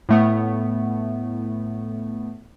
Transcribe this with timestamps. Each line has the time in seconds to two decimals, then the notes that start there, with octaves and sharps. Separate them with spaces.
0.09 A2 A3 B3